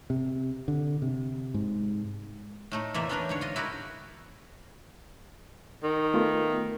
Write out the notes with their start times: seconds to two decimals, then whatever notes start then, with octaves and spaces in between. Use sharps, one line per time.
0.10 C3
0.68 D3
1.02 C3
1.54 G#2
2.71 A2 A3 D#4
2.94 E2 C3 E3 A#3 D5 E5
3.09 B3 C#4 D4 G4 A#4 B4
3.29 G#2 D3 C#5
3.41 F4 D#5
3.56 E4 F#4 G4 A#4 B4
5.84 D#3
6.14 A3 B3 F4